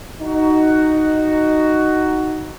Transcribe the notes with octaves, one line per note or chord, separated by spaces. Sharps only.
D#4 F#4